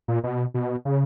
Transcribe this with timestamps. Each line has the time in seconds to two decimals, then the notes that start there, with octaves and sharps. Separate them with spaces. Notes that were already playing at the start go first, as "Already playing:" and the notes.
0.08 A#2
0.24 B2
0.54 B2
0.85 C#3